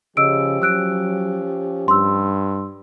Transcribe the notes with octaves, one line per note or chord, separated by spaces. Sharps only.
C#3 F3 C#4 G4 D#5 E6 D7
F#3 E6 F#6 D7
G2 C6 E6